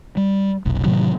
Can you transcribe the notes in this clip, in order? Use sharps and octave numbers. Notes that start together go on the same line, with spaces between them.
G3
F1 B1
A2 C3 D#3 F#3